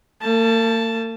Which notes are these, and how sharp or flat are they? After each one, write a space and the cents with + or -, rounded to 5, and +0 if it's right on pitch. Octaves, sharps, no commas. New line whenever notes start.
A#3 -45 A5 +0